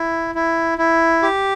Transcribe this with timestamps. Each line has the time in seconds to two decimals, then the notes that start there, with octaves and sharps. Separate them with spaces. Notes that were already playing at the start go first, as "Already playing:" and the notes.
Already playing: E4
0.35 E4
0.78 E4
1.23 G4